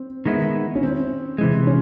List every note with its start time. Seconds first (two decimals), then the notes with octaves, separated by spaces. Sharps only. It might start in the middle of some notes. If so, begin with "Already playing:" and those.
Already playing: C4
0.26 D#3 G#3 B3 E4
0.75 C#4
0.83 C4
1.38 C3 E3 G#3
1.67 C#4